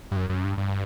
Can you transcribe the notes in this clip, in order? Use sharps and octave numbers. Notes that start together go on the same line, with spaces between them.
G2
F#2
F#2
G2
G2